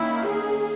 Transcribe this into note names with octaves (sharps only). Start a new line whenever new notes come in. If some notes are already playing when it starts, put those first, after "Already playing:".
Already playing: D#3 A#3 C#4 E4
G#4